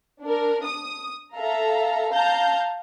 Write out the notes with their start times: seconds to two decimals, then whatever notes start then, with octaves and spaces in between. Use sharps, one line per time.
0.23 D4 A#4
0.65 D#6
1.34 A4 E5 F5 A#5
2.11 F5 A5 A#5 G6